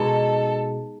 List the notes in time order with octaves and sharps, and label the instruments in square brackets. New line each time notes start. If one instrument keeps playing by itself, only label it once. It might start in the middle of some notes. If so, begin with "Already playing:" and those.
Already playing: [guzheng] B2 G#3 D#4 [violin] A4